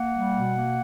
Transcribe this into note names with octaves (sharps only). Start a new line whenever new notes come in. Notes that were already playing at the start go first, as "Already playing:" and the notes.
Already playing: A#3 F#5
G3
B2
A#3